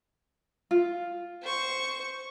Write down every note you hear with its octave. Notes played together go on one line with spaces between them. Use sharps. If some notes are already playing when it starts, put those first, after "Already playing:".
F4
C5 C#6